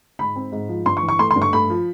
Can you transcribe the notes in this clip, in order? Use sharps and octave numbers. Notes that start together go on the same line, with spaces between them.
G#2 B5
C4
G#2
F3
G2 C6
C#6
E3
C#6
A3 C6
C6
G2
C#6
A3 B5
F3